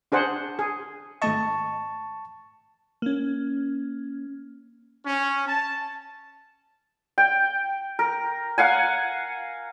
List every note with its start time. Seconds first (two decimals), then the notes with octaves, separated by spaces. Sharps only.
0.12 D4 G#4 C5 F#5
0.59 G#4
1.22 G#1 A3 D#5 A5 C#6
3.02 A#3 C#4
5.05 C#4
5.46 A5
7.18 G5
7.99 A#4
8.58 F5 F#5 G#5